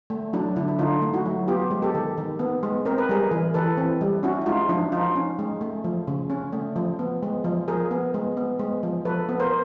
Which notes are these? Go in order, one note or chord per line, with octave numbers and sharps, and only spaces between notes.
A3
F#3 D4 E4
D3 D4 E4
E4
D3 D#4 F4
A3
E4 F#4
F#3
B3 F4 G4
G#3
G4 A4
D#3
D#3
B3
G#3
C4 A#4
B4
G3 G#4 A#4
E3
E3 A4 B4
C4
G3
C#4 E4 F#4
E4
G#3 D#4 F4
F3 D4 E4
F3 D#4 F4
C#4
G#3
A3
F3
C#3
C#4
A3
F3
B3
G#3
F3
F3 G#4 A#4
B3
G#3
B3
G#3
F3
F3 A4 B4
B3
A#4 C5